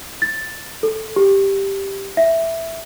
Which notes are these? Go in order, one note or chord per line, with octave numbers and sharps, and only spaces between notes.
A6
A4
G4
E5